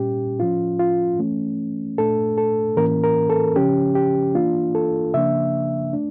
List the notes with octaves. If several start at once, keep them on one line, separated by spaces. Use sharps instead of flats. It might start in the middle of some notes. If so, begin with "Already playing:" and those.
Already playing: A#2 G3 C#4 G4
A2 F3 C#4 F4
F4
E3 A3 C#4
A#2 A3 D4 A4
A4
A2 E3 A#3 C#4 A#4
A#4
A4
C#3 F3 C#4 G4
G4
E3 A#3 D4 F4
A4
C#3 F3 A#3 D4 E5
A3 D4